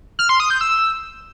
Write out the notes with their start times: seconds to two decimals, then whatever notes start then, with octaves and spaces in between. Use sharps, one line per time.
0.19 F6
0.29 C6
0.40 D#6
0.50 G6
0.61 E6